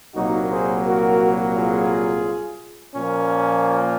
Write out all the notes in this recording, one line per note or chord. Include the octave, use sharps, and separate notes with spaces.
C2 A#2 F#3 A#3 D#4 F#4
G#4 C5
F#4 A#4
F4 G#4
A#2 F3 A#3 C#4